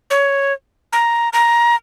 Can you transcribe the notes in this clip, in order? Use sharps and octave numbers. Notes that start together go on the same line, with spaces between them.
C#5
A#5
A#5